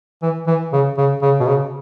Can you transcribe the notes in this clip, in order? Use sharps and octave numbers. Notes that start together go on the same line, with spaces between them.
E3
E3
C#3
C#3
C#3
B2
C#3